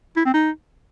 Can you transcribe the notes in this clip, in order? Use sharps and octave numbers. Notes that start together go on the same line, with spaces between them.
E4
C4
D#4